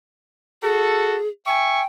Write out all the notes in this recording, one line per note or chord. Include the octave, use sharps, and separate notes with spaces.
F#4 G#4 A4
E5 G5 G#5 C#6